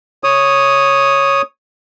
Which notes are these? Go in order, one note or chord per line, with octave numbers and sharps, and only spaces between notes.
C#5 D#6